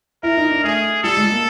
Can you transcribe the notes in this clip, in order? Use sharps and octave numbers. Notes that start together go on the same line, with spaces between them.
E4 A#4
D#4
D4
A3 G#4
G3 A4
G#3
A#3